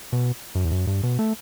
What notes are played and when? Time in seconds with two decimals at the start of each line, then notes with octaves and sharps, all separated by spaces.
0.13 B2
0.55 F#2
0.65 E2
0.71 F#2
0.87 G2
1.03 B2
1.19 A3